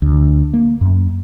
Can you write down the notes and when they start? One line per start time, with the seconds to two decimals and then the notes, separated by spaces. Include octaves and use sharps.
0.02 D2
0.54 A#3
0.81 F#2